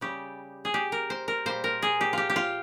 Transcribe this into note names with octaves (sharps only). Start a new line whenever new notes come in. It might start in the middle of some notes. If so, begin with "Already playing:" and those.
C#3 G3 G4
G#4
G4
A#4
C5
A#4
A#2 G3 C5
A#4
G#4
G4
F4 G4
G4
F4